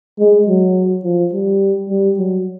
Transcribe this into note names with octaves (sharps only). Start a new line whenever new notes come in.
G#3
F#3
F3
G3
G3
F#3